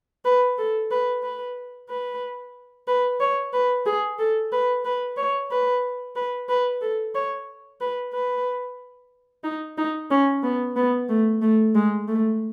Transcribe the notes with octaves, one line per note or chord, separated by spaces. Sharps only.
B4
A4
B4
B4
B4
B4
C#5
B4
G#4
A4
B4
B4
C#5
B4
B4
B4
A4
C#5
B4
B4
D#4
D#4
C#4
B3
B3
A3
A3
G#3
A3